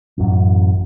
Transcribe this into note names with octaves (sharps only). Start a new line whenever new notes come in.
A1 F#2